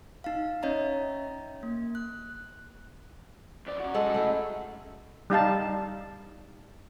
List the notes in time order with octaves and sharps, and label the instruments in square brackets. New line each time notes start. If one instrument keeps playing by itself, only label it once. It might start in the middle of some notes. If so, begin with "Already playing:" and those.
[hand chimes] D#4 F5
C#4 C#5 D#5 E5 A#5
A#3
F#6
[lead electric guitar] F2 D5
C#4 F#4
[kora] G#3 A4 F#5
A3 E4
[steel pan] G3 D#4 F5 A5